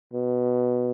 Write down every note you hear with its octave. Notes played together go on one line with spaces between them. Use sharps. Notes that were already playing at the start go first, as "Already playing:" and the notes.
B2